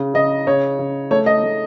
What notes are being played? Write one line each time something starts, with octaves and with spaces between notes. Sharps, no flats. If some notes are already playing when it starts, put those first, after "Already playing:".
Already playing: C#3
C#3 D#5
C#3 C#5
C#3
A3 C#5
D#5
A3